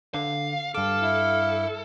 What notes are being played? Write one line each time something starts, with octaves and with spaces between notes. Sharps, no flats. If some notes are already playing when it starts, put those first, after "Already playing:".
D3 F5
G2 A4 F5 D6
E4